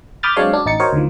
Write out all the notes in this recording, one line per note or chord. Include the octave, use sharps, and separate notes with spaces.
B5 D6 D#6 F6 G6 A6
F#3 G#3 C4 D4 C#5 F5
D4 F#4
A1 D#4 A6 C#7
F#4 A#4 C5 C#5 D#5
D2 D#3 F3